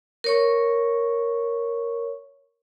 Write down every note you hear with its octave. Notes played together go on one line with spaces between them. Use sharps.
A#4 C#5 C#6